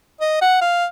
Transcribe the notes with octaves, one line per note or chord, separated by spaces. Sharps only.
D#5
F#5
F5